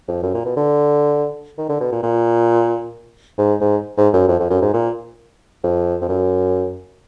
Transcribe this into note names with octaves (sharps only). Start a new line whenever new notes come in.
F2
F#2
A#2
B2
D3
D#3
D3
B2
A#2
A#2
G#2
G#2
G#2
F#2
F2
F2
F#2
G#2
A#2
F2
F2
F#2